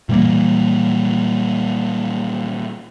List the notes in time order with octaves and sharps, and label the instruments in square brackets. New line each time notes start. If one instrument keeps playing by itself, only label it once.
[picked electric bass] A#2 E3 G3 A#3